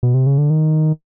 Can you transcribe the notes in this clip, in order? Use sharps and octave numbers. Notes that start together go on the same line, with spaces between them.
B2
C3
C#3
D3
D#3